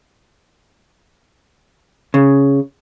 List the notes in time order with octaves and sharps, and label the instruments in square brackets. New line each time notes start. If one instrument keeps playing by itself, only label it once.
[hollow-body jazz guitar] C#3